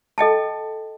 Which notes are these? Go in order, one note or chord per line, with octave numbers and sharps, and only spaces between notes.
A4 D#5 G5 A5